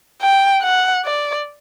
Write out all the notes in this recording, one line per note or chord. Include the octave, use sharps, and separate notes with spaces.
G5
F#5
D5